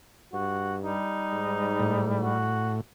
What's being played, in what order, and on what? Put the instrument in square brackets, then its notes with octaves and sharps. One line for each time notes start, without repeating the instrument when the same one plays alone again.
[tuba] G2 [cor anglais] F#4
[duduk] G3 [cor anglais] D#4
[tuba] G#2
[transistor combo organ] A2
[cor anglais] F#4